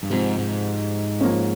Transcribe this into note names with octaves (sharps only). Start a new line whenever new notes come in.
G2
G#2 C3 F3 C4
G#2
F3 A#3 C#4